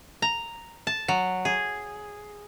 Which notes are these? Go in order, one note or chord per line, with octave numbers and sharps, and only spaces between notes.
A#5
A5
F#3
G#4